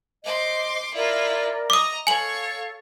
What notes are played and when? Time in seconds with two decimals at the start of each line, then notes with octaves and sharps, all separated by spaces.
0.24 C5 D#5 C6 D6
0.94 E4 F4 A#4 D5
1.70 D#5 A#5 D6 D#6
2.07 A4 C#5 F5 G#5 F#7